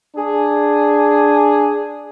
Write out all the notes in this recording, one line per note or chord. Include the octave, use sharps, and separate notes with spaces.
D4 G#4